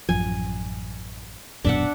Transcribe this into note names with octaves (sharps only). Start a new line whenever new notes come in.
A1 F#2 F3 G#5
D#1 F#2 B2 D4 E5 F#5